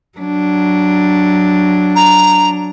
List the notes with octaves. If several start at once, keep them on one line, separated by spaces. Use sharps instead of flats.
F#3 D4
A#5